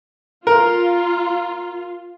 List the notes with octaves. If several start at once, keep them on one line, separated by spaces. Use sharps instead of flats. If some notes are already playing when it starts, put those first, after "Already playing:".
F4 A#4